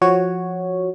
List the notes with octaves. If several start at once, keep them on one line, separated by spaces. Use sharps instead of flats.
F3 F#4 C#5